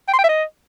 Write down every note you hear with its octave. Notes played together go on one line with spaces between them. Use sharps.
G5
C6
G5
E5
D#5